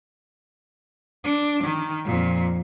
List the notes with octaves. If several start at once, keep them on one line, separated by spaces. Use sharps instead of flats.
D4
D#3
F2 A#2